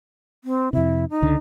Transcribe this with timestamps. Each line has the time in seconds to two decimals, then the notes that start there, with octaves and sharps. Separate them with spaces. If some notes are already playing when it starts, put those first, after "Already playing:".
0.44 C4
0.73 F2 C3 E4
1.10 D#4
1.22 C#2 D3